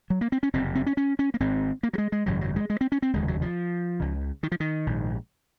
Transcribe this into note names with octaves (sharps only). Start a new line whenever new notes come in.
F#3
A#3
C4
C#4
F#1 F2 C3 C4
C4
C#4
C#4
C#4
A#3
G#1 G#2 C4
A#3
F#3
G#3
G#3
G#1 F#2 C#3 F#3
F#3
G#3
G#3
C4
C#4
C4
F1 D#2 C#3 G#3
F#3
F3
C#2 C#3
D#3
F3
D#3
A#1 G#2